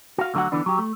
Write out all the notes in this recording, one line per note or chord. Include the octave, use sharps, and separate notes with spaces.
F#4 F5
D2 D3 F#3 E4 F#4 F#5
D3 E3 B3 D4
F#3 G4
A3